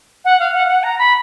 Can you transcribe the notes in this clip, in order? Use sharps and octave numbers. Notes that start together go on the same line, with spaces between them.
F#5
F5
F#5
F#5
A#5
B5